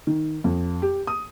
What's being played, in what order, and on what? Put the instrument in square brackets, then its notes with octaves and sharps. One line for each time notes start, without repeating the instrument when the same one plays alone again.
[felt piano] D#3
F2
G4
D#6